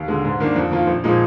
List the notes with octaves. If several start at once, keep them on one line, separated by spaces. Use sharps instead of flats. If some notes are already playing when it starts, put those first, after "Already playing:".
Already playing: D#2
D3 G#3
G#2
D#3 A#3 D4
F2
D#3 A#3 F4
A#1
A#2 F3 G#3 D#4